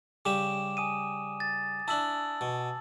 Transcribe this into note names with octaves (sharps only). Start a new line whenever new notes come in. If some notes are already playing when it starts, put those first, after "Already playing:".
C#3 G3 G4 D6 E7
G#5 D#6 D#7
A6
D4 E4 A5 E6 F#7
B2